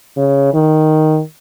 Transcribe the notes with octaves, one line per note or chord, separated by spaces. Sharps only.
C#3
D#3